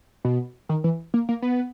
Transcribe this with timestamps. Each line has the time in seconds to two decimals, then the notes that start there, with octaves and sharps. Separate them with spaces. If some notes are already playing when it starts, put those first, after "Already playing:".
0.25 B2
0.69 D#3
0.84 E3
1.14 A#3
1.29 A#3
1.42 B3